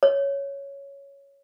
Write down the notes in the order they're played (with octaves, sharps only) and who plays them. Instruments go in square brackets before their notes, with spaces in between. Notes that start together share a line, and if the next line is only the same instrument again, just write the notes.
[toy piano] C#5